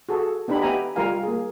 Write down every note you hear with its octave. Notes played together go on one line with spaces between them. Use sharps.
F#4 G#4 A4
B3 D4 D#4 G4 B5
B3 G4 E5 G#5 A#5 B5
G3 F4 A#4 F5 G#5
A#3 G#4